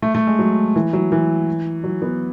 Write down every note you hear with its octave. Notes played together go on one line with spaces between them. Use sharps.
A3
A3
G#3
F#3
E3
F#3
E3
F#3
B3